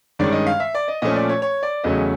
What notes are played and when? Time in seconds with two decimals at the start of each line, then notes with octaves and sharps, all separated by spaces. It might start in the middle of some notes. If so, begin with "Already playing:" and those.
0.19 G2 D#3 G#3 C#4 D5
0.32 D#5
0.46 F5
0.60 E5
0.75 D5
0.88 D#5
1.02 A#2 F3 A3 C#4 D#5
1.16 D5
1.29 C#5
1.42 C#5
1.63 D5
1.84 E2 C#3 F#3 A3 C#4 D#5